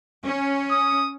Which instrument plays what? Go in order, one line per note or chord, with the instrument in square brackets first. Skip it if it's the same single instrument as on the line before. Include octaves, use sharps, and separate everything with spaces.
[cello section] C#4
[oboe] D#6